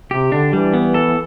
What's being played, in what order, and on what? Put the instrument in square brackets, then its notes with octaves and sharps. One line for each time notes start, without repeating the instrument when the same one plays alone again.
[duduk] C3 [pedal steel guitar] G4
[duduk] D3 [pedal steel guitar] D4
[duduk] E3 [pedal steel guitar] G3
[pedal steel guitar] B3
A4